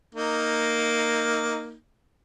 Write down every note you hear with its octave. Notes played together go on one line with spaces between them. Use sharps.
A#3 D#4